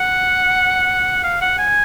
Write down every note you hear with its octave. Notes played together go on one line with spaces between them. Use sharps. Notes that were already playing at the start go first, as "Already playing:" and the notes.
Already playing: F#5
F5
F#5
G#5